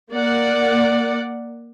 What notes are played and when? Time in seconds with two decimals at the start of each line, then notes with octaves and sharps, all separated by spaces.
0.12 A#3 D5 F#5